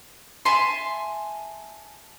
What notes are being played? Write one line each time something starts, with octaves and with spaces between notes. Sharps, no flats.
E5 G#5 A5 C6